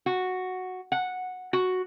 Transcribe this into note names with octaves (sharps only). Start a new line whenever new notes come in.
F#4
F#5
F#4